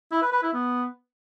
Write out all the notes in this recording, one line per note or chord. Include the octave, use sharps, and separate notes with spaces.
E4
B4
B4
E4
B3